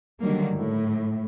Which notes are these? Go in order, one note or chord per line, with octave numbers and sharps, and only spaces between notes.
D3 D#3 F#3 G3 A#3
A2